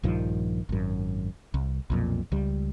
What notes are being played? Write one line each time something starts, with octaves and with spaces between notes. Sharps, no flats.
A#1 G2 D#3 F3
G#1 F#2
C2
B1 F2 A#2
C#2 G3